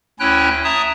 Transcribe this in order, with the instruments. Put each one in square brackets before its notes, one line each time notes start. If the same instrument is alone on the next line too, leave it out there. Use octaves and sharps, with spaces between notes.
[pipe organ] D2 C#4 E4 C#5 G5 F#6
E5 A5 A#5 D#6